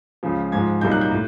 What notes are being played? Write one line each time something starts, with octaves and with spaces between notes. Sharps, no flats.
C#2 C#3 F3
G#2 F3 G#3 G#6
C2 A#2 F#3 A#3 D#4 G6
F#6
G6
A2